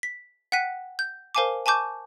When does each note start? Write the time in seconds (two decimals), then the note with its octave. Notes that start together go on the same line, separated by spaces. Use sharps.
0.03 B6
0.52 F#5 G5 F#6 B6 D#7
0.99 G6
1.35 A#4 C5 F5 G#5 A5 D6
1.66 G#5 A5 C#6 D6 G6